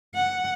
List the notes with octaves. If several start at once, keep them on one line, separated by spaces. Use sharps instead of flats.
F#5